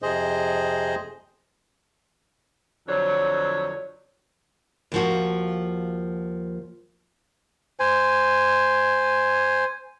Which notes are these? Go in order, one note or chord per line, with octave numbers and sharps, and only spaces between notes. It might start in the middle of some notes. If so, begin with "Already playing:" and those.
F2 C3 G#4 C5 D#5
F2 D3 F#3 C5 C#5
D#2 F3 F#4
C5 G#5